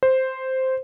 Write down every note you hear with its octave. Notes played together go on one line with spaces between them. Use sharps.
C5